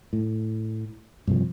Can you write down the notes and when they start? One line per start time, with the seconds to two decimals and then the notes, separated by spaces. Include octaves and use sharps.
0.13 A2
1.27 G2 C3 F3